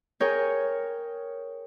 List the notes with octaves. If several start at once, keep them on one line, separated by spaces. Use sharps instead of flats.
G#4 A#4 C#5 G5 G#5